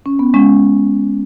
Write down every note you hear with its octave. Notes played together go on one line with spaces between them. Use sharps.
C#4
B3
G#3 C#4